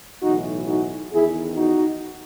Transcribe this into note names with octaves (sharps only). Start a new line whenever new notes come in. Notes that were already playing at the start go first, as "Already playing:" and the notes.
B1 A2 E3 D#4 F#4
D#4 F#4
E2 D#3 E4 G#4
D#4 F#4